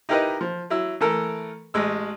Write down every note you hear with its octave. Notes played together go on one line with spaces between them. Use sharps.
D#4 E4 G4 A#4 B4 D#5
F3
F#3 E4 E6
E3 A3 A4 A#4
A1 G#3 E6